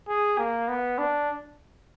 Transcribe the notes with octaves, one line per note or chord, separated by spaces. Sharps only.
G#4
A#3
B3
D4